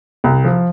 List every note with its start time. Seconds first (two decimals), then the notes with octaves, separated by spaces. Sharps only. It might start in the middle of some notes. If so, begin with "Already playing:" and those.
0.24 C2
0.45 F3